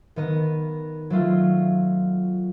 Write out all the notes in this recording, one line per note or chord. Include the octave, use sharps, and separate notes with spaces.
D#3 B3 D#5
F#3 A3 F4